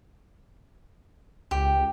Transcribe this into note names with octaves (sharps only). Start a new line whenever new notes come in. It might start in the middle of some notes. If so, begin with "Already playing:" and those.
C#2 G4